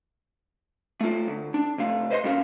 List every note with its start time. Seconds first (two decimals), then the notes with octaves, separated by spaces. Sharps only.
1.01 A3 F4
1.27 D2
1.54 D4
1.78 C3 A3 F5
2.10 B4 C5 D#5 E5 C6
2.24 A#2 G3 C#4 F#4 A#4 F5